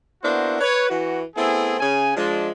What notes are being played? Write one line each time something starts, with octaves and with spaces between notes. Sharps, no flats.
A#3 B3 D4 E4 F#4 C5
B4 C#5
E3 F#4
A3 B3 C4 E4 G#4
C#3 G#5
F3 G#3 D4